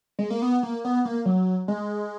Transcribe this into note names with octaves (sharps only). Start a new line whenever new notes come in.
G#3
A#3
B3
A#3
B3
A#3
F#3
G#3